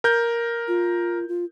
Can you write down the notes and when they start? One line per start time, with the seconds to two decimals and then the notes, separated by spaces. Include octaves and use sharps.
0.04 A#4 G6
0.68 F4
1.29 F4